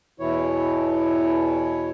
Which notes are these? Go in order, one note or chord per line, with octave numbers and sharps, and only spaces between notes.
E2 B2 E3 E4 C#5